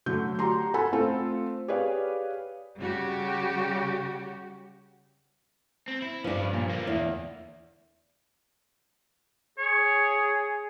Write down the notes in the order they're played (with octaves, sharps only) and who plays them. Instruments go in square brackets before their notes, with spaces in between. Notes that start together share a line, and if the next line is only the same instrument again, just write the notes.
[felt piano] D3 F#3 A3 G6
F#4 G4 A#5 C6
A4 F#5 G#5 B5
A3 C4 F4 A4
G4 G#4 B4 C#5 D5 F5
[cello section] C#3 G3 F#4 G4
[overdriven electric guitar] C4
E4
[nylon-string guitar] G2 F3 [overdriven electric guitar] C#4 D5
[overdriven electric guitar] A#2
D3 A#3
[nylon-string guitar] E2
[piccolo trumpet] G#4 [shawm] C#5